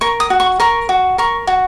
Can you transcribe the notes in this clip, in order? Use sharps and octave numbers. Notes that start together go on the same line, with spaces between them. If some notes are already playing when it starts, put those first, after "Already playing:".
A#4 C#6
D#6
F#4
C#6
A#4 C#6
F#4
A#4 C#6
F#4